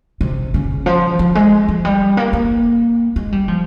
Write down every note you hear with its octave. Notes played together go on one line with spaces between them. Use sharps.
C3
C#3
F3
F3
G#3
F3
G3
A#3
A#3
G#3
G3
F3